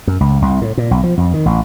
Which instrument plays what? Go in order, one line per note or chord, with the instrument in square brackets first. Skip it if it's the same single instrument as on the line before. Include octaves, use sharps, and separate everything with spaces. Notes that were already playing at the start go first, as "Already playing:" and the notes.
[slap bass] F#2
C#2
C2
A2
A#2
B1
F3
F2
D#3
A1